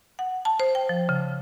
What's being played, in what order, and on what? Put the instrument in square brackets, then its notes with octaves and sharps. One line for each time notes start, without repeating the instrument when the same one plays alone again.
[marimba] F#5
A5
C5
G5
F3
C#3